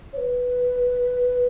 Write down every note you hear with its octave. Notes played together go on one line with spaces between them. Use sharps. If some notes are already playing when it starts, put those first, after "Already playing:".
C#5
B4